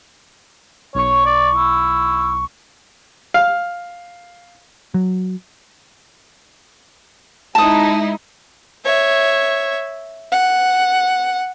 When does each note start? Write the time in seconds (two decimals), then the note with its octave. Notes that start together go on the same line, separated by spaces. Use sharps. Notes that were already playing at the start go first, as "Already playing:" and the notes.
0.95 B1 C#5 C#6
1.25 D5
1.55 E4
3.34 F5
4.94 F#3
7.55 G#3 D#4 E4 A5 D#6
8.85 C#5 E5
10.32 F#5